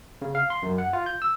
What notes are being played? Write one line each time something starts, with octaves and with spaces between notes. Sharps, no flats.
C#3
F5
C6
F#2
F#5
F4
G6
E6